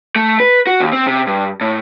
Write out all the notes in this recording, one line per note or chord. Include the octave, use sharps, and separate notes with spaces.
A3
B4
F#4
D#2
C4
C3
G2
A2